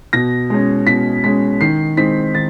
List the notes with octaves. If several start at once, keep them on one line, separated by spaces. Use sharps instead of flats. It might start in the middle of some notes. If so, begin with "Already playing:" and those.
B2 A#6
G#3 C#4
B2 B6
G#3 C#4 B6
D#3 C7
G#3 C4 D#4 B6
D#3 A6